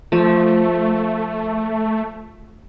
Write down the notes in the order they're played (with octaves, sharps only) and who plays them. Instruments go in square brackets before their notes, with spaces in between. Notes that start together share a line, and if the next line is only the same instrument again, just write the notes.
[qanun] F3 [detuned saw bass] A3